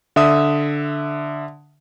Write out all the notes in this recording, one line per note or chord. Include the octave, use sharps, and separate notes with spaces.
D3 E5 D#6